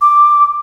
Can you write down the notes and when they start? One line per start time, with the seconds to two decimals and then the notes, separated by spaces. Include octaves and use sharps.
0.01 D6